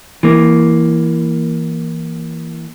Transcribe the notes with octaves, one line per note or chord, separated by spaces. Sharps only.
E3 A#3